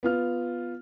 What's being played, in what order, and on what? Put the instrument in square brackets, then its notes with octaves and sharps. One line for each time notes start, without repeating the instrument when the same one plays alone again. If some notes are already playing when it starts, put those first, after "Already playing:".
[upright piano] B3 F4 F6